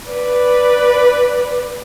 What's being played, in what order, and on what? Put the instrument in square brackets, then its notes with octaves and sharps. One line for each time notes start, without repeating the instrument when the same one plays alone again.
[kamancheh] B4 D5